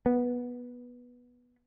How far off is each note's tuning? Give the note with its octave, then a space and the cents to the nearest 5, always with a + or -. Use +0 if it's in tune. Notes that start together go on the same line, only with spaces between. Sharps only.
B3 -10